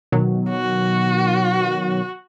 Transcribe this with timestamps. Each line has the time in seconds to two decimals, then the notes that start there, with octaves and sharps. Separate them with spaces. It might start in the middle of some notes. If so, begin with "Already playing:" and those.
0.12 B2 D#3 F#3
0.50 F#4